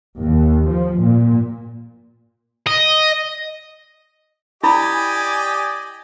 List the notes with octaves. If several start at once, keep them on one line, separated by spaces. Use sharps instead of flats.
D#2
F3
A#2
D#5
E4 G4 D5 D#5 G#5 B5 D6